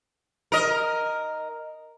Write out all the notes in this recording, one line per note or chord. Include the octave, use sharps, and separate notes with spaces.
A#4 D#5